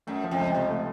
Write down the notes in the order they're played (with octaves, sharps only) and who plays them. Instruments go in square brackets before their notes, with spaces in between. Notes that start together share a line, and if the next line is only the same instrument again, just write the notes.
[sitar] F#2 [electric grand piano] A3
[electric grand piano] F3
[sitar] F2
[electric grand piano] C#2
[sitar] F2 [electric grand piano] C3
[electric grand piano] A3